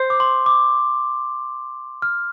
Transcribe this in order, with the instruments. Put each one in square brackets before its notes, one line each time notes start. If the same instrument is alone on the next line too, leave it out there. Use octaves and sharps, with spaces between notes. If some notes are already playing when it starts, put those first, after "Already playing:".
Already playing: [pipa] C5
[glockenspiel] D6
C6
D6
F6